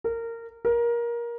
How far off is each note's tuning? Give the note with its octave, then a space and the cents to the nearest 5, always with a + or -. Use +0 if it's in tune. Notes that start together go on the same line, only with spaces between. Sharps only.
A#4 -20
A#4 +20